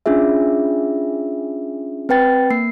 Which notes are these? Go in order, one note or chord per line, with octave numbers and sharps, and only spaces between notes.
C#4 D4 F4 G#4 E5
C4 B4 G5 A6
A#3 C7